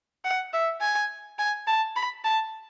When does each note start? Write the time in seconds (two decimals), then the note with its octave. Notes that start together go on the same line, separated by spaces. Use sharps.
0.25 F#5
0.53 E5
0.81 G#5
1.39 G#5
1.67 A5
1.96 B5
2.24 A5